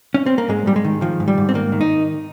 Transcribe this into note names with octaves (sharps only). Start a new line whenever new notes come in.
C#4
C4
A#3
G#2 G#3
G#2 G3
G#3
D#3
D#3 F3
G#2
G3
G#2
C4
D#3 A#3
D#3
D#4